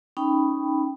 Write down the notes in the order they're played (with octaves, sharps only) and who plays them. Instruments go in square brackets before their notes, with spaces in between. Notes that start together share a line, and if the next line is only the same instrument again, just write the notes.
[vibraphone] C#4 D#4 G5 B5